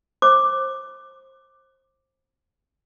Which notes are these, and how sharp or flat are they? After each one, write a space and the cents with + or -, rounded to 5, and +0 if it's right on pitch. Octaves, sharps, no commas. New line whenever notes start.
C5 +25 D6 +5